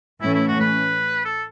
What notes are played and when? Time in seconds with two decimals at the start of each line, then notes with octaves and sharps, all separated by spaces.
0.21 A2 E3 A3 C#4 E4
0.34 E4
0.48 F#4
0.60 B4
1.25 A4